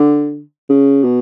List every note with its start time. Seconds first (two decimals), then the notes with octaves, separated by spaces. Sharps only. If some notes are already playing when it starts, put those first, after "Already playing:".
Already playing: D3
0.69 C#3
1.04 B2